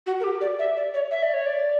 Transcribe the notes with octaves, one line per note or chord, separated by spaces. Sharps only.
F#4
A#4
G4
D5
E5
D5
C#5
E5
D5
C#5
D5